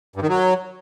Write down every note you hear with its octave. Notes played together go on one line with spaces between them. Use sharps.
G2
D#3
F#3